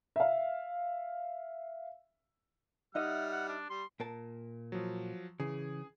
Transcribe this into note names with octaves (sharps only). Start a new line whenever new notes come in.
E5 F5
G3 D#4 D#5 E5 F#5 F6
F#5
D4
G3 C6
A#2 A#4 A5
F3 F#3
C#3 E3 G#4